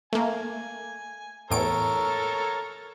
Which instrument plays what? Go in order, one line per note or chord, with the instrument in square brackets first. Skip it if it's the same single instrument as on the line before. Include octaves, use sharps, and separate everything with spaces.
[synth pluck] A3 A#3 [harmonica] G#5
[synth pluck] E2 A2 D7 [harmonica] A4 A#4 C#5